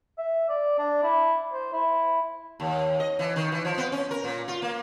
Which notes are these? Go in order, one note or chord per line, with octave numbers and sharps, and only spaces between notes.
E5
D5
D4
E4
C5
E4
D#2
D#5
E3
D#3
E3
F3
B3
C#4
A#4
A#2
F4
A#3